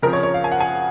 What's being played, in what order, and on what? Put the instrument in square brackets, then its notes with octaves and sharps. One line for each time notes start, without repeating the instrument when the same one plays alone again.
[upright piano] C#3 F3 C4 A#4
C#5
C#5
F5
G#5
F#5
G#5